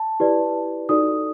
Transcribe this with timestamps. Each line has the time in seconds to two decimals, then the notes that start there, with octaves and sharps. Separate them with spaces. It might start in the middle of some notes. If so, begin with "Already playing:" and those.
Already playing: A5
0.20 E4 G4 B4 D5
0.89 D#4 F#4 A4 D5 D#6